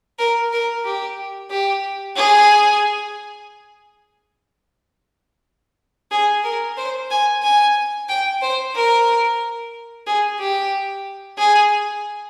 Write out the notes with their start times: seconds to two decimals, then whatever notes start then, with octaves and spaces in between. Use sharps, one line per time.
0.19 A#4
0.52 A#4
0.85 G4
1.51 G4
2.16 G#4
6.11 G#4
6.44 A#4
6.77 C5
7.11 G#5
7.43 G#5
8.09 G5
8.42 C5
8.75 A#4
10.07 G#4
10.39 G4
11.38 G#4